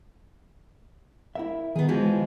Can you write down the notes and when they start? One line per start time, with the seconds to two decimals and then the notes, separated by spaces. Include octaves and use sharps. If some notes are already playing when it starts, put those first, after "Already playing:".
1.35 E4 A#4 E5
1.75 D#3 B3 G#4
1.88 E3 F3 G#3 F#4